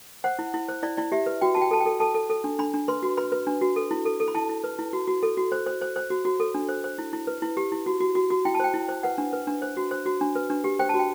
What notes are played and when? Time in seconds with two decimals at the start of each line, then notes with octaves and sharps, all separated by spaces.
0.24 C5 F#5
0.39 E4
0.54 E4
0.69 C5
0.83 E4 D5
0.97 E4 D5
1.12 G4 E5
1.26 B4
1.41 F#4 G5
1.55 F#4 A5
1.61 G5
1.71 A4 A5
1.80 G5
1.86 A4
2.00 A4 A5
2.14 A4
2.30 A4
2.44 D4
2.59 D4 B5
2.74 D4
2.88 B4 C6
3.03 F#4
3.17 B4 B5
3.32 B4
3.47 D4
3.61 F#4
3.76 A4
3.91 E4
4.05 A4
4.20 A4
4.28 B5
4.34 E4 A5
4.49 E4
4.64 B4
4.79 E4
4.93 F#4
5.08 F#4
5.23 A4
5.37 F#4
5.52 C5
5.66 C5
5.81 C5
5.96 C5
6.10 F#4
6.25 F#4
6.40 A4
6.54 D4
6.69 C5
6.84 C5
6.98 E4
7.13 E4
7.27 B4
7.42 E4
7.57 G4
7.72 E4
7.86 F#4
8.00 F#4
8.15 F#4
8.30 F#4
8.45 E4 G5
8.54 A5
8.60 C5 G5
8.74 E4
8.89 C5
9.03 B4 F#5
9.18 D4
9.33 B4
9.47 D4
9.62 C5
9.77 F#4
9.91 C5
10.06 F#4
10.21 D4
10.35 B4
10.50 D4
10.64 G4
10.79 C5 G5
10.89 A5
10.94 F#4
10.99 G5